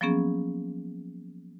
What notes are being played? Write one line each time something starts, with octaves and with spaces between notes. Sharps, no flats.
F3 F#3 A#3 B3 C#4 G#4